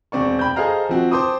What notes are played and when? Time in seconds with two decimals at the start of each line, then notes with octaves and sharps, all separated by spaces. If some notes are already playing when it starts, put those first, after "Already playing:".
0.12 E1 C4 D5 C#6
0.39 G5 B5 G6
0.56 G#4 A4 C5 D#5 F5 A#5
0.89 F3 C4 F#4
1.11 C5 G5 A5 C6 D6 D#6